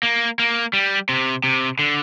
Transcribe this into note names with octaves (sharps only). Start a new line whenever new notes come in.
A#3
A#3
G3
C3
C3
D3